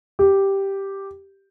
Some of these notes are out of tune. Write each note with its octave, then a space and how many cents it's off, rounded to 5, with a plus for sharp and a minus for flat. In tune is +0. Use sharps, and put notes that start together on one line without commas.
G4 +0